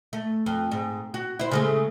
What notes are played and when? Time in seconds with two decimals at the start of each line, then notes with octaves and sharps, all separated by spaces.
0.13 A3
0.46 F2
0.71 G#2
1.14 F#4
1.39 E4 C5
1.51 C#3 G#3 A3